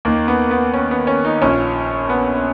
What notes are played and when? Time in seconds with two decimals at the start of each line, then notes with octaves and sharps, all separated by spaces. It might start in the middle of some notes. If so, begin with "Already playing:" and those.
0.05 D#2 D#3 A#3
0.28 B3
0.51 B3
0.74 C#4
0.91 B3
1.07 C#4
1.25 D#4
1.42 A#1 A#2 C#4
2.10 B3